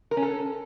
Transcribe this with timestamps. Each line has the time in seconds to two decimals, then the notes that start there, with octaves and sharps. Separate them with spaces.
0.11 A#4
0.17 C#4
0.23 A4